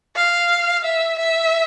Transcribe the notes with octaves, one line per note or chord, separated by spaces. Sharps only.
F5
E5
E5